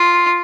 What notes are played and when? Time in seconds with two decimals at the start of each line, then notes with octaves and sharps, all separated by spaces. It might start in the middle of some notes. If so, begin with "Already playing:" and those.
Already playing: F4